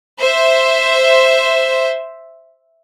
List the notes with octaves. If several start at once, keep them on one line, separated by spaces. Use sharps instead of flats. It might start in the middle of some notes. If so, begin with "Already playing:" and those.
C5 E5